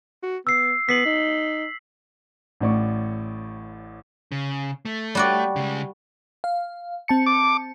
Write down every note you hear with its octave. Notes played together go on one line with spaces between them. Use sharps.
F#4
B3 E6 C7
B3 B6 C7 F#7
D#4
A1 A2 D5 C#6
C#3
A3
G3 F#4 D5
C#3 G#3
F5
C4 A5 C#7
D6